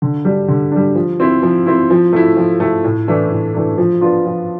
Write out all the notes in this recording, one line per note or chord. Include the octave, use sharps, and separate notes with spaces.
D3
G3 D4
D3
G3 D4
F3
C4 E4
F3
C4 E4
F3
A3 E4
F3
A3 E4
A2
E3 A3 D4
A2
E3 A3 D4
F3
B3 D4 F4
F3